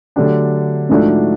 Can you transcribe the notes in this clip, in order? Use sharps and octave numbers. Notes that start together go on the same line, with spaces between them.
D3 F#3 A3 D4 G4
G#2 F3 A3 D4 F#4